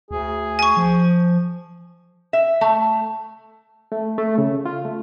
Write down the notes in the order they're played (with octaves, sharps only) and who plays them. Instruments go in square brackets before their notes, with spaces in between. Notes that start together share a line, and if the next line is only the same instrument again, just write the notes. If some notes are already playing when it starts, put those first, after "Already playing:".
[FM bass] D2 [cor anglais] G#4
[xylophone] G#5 C#6
[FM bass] F3
[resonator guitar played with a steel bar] E5
A3
[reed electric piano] A3
A3
C#3
F4
A3